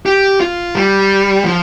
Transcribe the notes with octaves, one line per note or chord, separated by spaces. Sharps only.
G4
F4
G3
F3